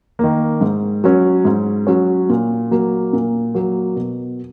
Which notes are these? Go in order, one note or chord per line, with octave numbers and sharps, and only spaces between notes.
D#3 A#3
G#2
F#3 C#4
G#2
F#3 C#4
A#2
F#3 A#3
A#2
F#3 A#3
B2